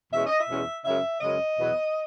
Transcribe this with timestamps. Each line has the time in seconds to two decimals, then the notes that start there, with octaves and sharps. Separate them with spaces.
0.12 E2 B2 G#3 C#4 E5
0.25 D#5
0.37 E5
0.48 E2 B2 G#3 C#4
0.84 F#2 C#3 G#3 E5
1.20 F#2 C#3 G#3 D#5
1.57 E2 B2 F#3 B3